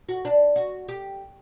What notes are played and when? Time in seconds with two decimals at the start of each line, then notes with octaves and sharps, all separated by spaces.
0.09 F#4
0.25 D4
0.56 F#4
0.88 G4